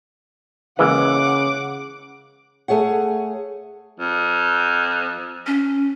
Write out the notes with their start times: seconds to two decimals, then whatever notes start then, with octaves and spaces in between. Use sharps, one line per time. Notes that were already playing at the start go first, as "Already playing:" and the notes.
0.79 C#3 E3 G#3 A#3 F#5 D6
2.68 A3 G#4 C#5 F#5
4.00 F2
5.47 C#4